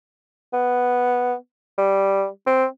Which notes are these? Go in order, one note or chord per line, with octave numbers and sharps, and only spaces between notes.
B3
G3
C4